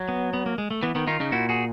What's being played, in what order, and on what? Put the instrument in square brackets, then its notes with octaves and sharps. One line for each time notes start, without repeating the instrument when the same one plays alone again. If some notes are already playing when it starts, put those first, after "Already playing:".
Already playing: [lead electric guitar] F#3
[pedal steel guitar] B3
B3
A#3
G#3
A3
[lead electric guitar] E3 [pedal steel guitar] B3
[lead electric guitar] D#3 [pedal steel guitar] B3
[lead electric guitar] D#3 [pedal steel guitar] D#4 F4
[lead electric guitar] C#3 [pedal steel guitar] C#4 D#4
[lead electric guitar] A#2 [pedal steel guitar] E4 F#4
[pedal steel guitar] F#4 G#4